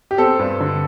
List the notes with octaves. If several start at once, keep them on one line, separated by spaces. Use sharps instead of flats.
G4
C4 A4
G2
D3